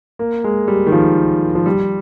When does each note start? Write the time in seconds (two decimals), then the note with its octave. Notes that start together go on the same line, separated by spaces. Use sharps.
0.19 A#3
0.44 G#3
0.68 G3
0.87 D#3
0.92 F3
1.55 F3
1.66 G3